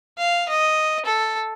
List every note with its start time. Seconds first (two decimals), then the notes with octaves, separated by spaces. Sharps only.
0.18 F5
0.49 D#5
1.05 A4